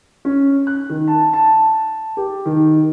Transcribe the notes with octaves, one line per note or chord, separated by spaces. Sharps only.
C#4
F#6
D#3
A5
A5
G4
D#3